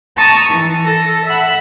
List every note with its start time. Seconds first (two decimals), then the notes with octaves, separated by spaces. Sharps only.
0.17 A5 A#5 C#6 D#6 E6 A6
0.49 E3
0.84 A4 A#6
1.26 E5 F#5 B5